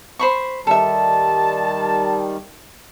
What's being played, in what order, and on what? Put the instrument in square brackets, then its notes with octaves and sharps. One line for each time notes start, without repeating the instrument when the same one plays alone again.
[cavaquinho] C5 B5 C#6
[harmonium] D#3 G3 [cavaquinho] A4 E5 [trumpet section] A5